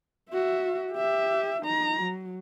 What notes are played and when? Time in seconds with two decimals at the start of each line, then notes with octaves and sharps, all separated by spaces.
0.30 F#4 E5
0.93 G4 E5
1.62 D#4 A#5
2.01 F#3